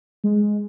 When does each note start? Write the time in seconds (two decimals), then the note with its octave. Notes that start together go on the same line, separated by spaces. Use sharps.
0.24 G#3